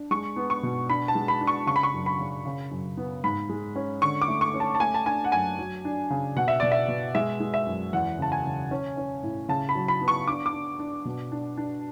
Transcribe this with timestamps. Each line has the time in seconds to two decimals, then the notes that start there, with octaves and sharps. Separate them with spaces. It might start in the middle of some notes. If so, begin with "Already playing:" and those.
Already playing: D4
0.11 G#3 C#6
0.36 B3
0.50 C#6
0.63 B2
0.90 D4 B5
1.08 A5
1.15 G#3
1.28 B5
1.41 D4
1.47 C#6
1.67 C#3 C#6
1.76 B5
1.83 C#6
1.94 F#2
2.06 B5
2.19 C#3
2.46 C#3
2.71 F#2
2.97 B3
3.24 G#2 B5
3.49 G#3
3.76 C#4
4.02 D3 C#6
4.22 D6
4.28 A3
4.41 C#6
4.54 C#4
4.60 A5
4.75 A5
4.80 A3 G#5
4.94 A5
5.06 D4 G#5
5.24 F#5
5.32 F#2 G#5
5.58 F#3
5.85 D4
6.10 C#3
6.36 B2 F#5
6.48 E5
6.60 B2 D5
6.72 E5
6.88 B2
7.15 G#3 E5
7.40 G#3
7.54 E5
7.67 F#2
7.93 E2 F#5
8.19 C#3 A5
8.32 G#5
8.45 C#3
8.71 C#4
8.97 C#4
9.23 A2
9.49 C#3 A5
9.69 B5
9.75 F#3
9.88 B5
10.02 B3
10.08 C#6
10.28 D4 D6
10.46 D6
10.53 D4
10.79 D4
11.05 B2
11.32 D4
11.58 D4